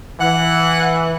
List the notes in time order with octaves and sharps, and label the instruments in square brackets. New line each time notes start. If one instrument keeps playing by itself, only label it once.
[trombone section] E3 [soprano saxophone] F#5